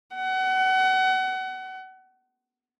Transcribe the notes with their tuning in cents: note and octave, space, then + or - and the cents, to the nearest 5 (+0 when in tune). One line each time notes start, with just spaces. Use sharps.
F#5 +30